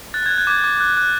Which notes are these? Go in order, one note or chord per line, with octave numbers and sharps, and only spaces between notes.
F#6 A6
F#6 G#6
G6
D6 G#6
D6
F#6
F#6